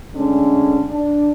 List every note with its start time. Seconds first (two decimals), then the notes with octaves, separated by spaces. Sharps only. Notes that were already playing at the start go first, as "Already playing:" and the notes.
0.15 D3 G#3 A3 C#4
0.90 D4